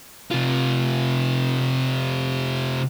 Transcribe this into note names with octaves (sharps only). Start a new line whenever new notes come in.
C3 F4